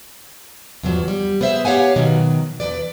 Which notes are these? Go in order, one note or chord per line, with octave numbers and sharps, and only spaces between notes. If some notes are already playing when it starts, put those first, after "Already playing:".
E2 G2 F3 F#3
G3
B3 G#4 C5 E5
G4 C#5 F5 F#5 G#5
B2 D#3 F#3
E2 G#2 B4 D5